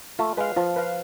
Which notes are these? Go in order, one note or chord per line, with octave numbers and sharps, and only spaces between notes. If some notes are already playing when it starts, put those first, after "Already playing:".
A3 F4
G#3 B4 F5
F3 F4
B4 F5